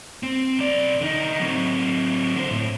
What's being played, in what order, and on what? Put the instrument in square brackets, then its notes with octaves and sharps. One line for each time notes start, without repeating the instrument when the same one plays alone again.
[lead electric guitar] C4
B1 D5
D3 D#4
F#3 C4
D3 C5
A2